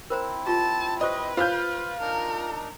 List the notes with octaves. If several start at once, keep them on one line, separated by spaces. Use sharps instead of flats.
C4 E4 A#4 C5 A#5
F4 G4 A5
G4 B4 C5 D5 D#5
F4 C5 F5 B5 F6 G6
D4 D#4 A#4